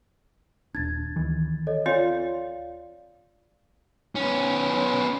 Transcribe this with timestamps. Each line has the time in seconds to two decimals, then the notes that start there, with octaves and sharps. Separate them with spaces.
0.75 D#1 D4 G#6 A6
1.16 D2 D#3 E3
1.67 A4 C#5 D#5
1.86 C4 F4 C#5 D5 F5
4.15 B3 C#4